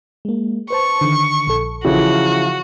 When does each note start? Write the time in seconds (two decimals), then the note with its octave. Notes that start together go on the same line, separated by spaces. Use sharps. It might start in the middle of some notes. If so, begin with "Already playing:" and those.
0.25 G#3 A#3
0.70 B4 C5 A5 C#6
1.01 D3 D#3
1.47 A#1 A4
1.85 C#3 E3 F3 F#4
2.15 F5